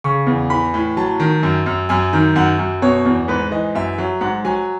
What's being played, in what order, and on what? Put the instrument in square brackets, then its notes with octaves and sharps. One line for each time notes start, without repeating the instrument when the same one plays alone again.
[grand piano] C#3 C#6
E2
E3 B5
A2
F#3 A5
D#3
F#2
F#2
F#2 G#5
D#3
F#2 F#5
F#2
B2 C#5
E2
G#2 B4
E3 D#5
F#2 E5
F#3
G#2 F#5
F#3 G#5